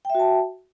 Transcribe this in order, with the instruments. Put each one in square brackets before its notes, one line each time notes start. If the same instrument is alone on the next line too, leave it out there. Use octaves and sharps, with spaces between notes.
[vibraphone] G5
E5
F#4
A5